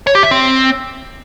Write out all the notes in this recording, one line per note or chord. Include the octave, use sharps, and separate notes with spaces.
C#5
G4
E5
C4